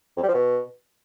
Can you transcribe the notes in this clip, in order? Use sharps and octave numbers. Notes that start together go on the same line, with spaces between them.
F2
G3
F3
B2